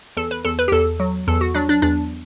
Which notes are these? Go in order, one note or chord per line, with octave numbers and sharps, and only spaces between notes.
E2 A4
B4
E2 A4
B4
G4
E2 A4
F#3
E2 A4
F#4
F#3 D4
D4
E2 D4